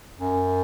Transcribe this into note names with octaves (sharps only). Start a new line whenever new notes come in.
F#2